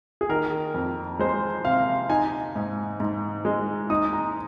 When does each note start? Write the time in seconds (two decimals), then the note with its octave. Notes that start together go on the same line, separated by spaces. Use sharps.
0.21 G#4
0.29 D#3 A#4
0.74 F2
1.19 G#3 C5
1.65 C3 F5
2.10 D#4 G#5
2.56 G#2
3.00 G#2
3.45 G#3
3.90 D#4 D#6
4.13 A#5